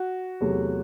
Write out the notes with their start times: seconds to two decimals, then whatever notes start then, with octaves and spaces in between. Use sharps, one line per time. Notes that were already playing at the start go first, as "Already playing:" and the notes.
Already playing: F#4
0.41 E2 C3 F#3 A3